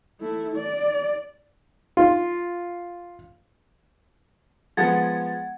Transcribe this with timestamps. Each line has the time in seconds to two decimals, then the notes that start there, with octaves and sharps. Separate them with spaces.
0.21 A3 E4
0.56 D5
1.97 F4
4.77 F3 G#3 B3 F#5 G#6 A6